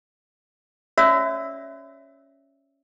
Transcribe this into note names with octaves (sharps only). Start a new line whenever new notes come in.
C#4 F#4 C#5 D5 E5 E6